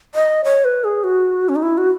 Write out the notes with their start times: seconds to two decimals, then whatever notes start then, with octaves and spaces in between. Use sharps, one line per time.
0.15 D#5
0.44 C#5
0.65 B4
0.84 G#4
1.04 F#4
1.49 C#4
1.56 D#4
1.62 E4
1.78 F#4